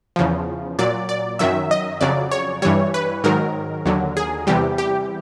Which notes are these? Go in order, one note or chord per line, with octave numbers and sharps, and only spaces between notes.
E2 C#3 F3
A#2 F#3 D5
D5
F#2 D#3 F#3 E5
D#5
F2 C#3 F#3 D5
C#5
G2 E3 G3 C#5
B4
G#2 D#3 F#3 A#4
D#2 D3 F#3
G#4
E2 C3 E3 G3 G4
G4